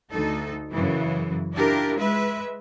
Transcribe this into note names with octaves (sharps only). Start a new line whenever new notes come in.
D2 D#4 A4
F#2 C#3 E3
D4 E4 F4 G4 A#4
G#3 B4 E5